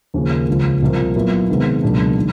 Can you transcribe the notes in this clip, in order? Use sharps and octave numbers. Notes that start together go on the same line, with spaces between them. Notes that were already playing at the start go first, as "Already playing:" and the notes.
D#2 C#3 F3 A#3 C#4
C#2 C#3 F3
C2 A#2 F3 A#3
A#2 F#3 B3 E4
C3 D#3 G#3 B3 D#4
C#2 B2 F#3 A#3 D4
D#3